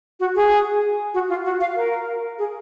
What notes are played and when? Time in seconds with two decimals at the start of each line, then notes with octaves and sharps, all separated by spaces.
0.20 F#4
0.35 G#4
1.14 F#4
1.29 F4
1.45 F#4
1.60 F5
1.76 A#4
2.38 G#4